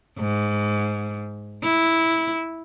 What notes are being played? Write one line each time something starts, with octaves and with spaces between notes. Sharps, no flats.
G#2
E4